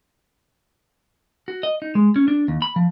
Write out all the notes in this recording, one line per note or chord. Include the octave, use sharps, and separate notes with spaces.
F#4
D#5
D#4
G#3
C#4
D4
D#2
B5
F3